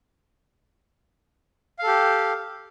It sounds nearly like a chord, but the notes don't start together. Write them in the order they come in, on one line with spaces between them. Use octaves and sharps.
F5 A4 G4